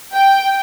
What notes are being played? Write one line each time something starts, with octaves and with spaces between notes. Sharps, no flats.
G5